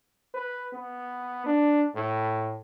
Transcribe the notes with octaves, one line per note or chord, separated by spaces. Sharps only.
B4
B3
D4
A2